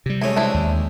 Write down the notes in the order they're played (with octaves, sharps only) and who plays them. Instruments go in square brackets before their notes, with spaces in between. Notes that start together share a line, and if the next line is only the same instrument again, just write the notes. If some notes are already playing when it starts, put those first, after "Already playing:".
[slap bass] C3 G3
[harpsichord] G#3 A3 C#4 [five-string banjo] E4
[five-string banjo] C4 D4 E4
[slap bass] D#2